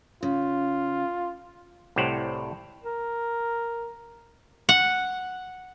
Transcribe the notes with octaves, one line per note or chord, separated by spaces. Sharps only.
C#3 F4
C2 A2 G4 C5 C#5 F#5
A#4
F#5